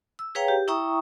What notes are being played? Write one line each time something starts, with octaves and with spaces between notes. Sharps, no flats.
E6
G#4 B4 C#5 F5 G5 A#5
G4
E4 E5 G5 A#5 C#6 D#6